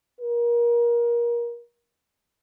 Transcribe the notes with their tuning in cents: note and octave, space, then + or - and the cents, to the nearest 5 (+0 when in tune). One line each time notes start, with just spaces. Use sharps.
A#4 +25